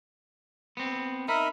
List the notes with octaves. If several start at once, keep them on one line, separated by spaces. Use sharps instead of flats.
B3 C4
D#4 A#4 E5 B5